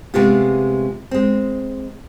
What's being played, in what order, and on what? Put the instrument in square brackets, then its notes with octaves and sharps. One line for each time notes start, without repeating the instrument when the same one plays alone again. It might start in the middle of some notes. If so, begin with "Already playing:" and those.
[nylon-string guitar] C3 G#3 A3 B3 F4 G4
G#3 C4